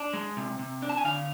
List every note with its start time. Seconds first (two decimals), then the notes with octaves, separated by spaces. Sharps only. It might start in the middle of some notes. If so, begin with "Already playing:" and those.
Already playing: D4
0.14 G#3
0.37 C3
0.59 C3
0.82 D4
0.89 A5
0.97 G#5
1.04 D3 F5